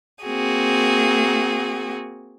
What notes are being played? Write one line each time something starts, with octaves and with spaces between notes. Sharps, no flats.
A#3 C4 F#4 G#4